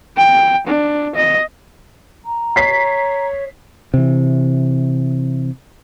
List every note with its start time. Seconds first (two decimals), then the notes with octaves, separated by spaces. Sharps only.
0.17 G5
0.67 D4
1.15 D#5
2.24 A#5
2.56 C#5 B6 C7
3.94 C3 E3